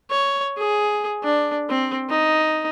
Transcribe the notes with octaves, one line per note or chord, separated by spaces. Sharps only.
C#5
G#4
D4
C4
D#4